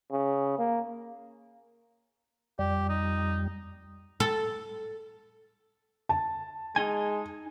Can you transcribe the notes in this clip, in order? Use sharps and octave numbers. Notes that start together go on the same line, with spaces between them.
C#3
A#3
F2 G3 G4
D#4
A4
A5
G#3 D#4 G#5